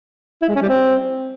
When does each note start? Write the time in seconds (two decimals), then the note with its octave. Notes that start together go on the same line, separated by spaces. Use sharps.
0.42 E4
0.49 G#3
0.55 C#4
0.62 G3
0.69 C4